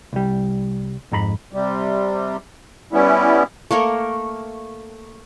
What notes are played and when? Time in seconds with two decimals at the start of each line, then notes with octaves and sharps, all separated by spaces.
0.13 C2 G3
1.12 F2 G#2 A#5 B5
1.53 C3 G3
2.93 G3 B3 C#4 E4
3.71 A3 A#3 A#4 C#5